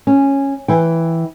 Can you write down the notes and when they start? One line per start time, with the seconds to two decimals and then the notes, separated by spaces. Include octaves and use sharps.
0.07 C#4
0.68 E3 G5